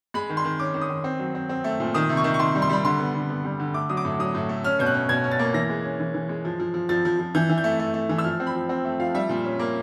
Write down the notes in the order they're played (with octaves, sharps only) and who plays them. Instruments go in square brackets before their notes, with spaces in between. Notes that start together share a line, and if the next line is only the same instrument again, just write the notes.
[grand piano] G#3 B5
D#3
C6
D#3
C#4 D6
D#3
D#6
D#3
C4
F#3
C4
C4
A3
A#2
D#3 D#6
C3
C#6
D#3
C#6
D#3 C6
G3
C6
G3 B5
D3 C6
B3
D3
B3
G3
D3
A3 D6
F#3 D#6
D6
A2
F#3 D#6
A2
A3
C#4 F6
B2 G6
F#6
C#4
B2 G#6
C#4
A6
A#3
E3 A#6
G#3
C#4
E3
E3
G#3
F3
F3
F3
F3 A6
F3
F3
E3 G6
E3
G6
A3
A3
A3
E3
E6
F3 F6
C4
B5
F3
C4
A3
F3 F5
G3 E5
A#2
C#4
A#3